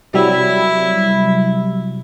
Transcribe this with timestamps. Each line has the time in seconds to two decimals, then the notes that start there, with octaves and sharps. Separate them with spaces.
0.14 C3 F#3 G3 E4 E5